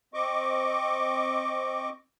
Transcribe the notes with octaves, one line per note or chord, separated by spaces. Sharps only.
C4 D#5 C#6 D6